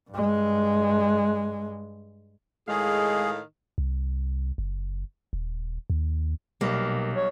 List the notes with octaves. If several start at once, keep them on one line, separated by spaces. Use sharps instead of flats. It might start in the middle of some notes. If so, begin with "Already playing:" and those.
G2 G#3
A2 D#3 G#3 G#4 F5
C2
F#1
D#1
D#2
B1 B2 G3 A#3
C#5